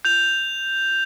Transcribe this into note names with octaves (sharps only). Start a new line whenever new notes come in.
G6 F7